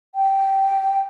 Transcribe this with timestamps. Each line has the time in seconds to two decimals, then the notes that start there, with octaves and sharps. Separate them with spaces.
0.15 G5